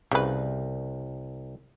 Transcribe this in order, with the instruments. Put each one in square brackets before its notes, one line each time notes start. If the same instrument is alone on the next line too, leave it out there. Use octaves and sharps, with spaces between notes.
[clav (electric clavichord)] C2 [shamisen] C#3 B4